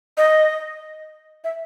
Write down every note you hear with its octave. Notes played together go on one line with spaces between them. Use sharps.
D#5
E5